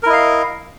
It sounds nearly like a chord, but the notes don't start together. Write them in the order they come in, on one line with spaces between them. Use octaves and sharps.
A#4 E4 D#5 F5